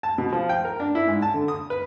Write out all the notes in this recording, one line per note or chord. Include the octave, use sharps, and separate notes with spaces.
A5
B2
F3
G5
A#4
D4
E4
G#2
A5
D3
D#6
B4